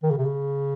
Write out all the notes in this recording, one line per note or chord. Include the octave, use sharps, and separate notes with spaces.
D#3
C#3
C3
C#3